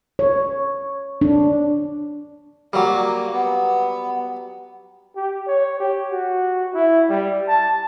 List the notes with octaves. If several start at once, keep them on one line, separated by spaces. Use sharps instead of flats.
C#5
D4
F#3 G3 A#3
B3
G4
C#5
G4
F#4
E4
G3
A5